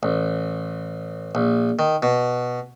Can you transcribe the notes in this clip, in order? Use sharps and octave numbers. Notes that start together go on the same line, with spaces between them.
A1
A#1
D#3
B2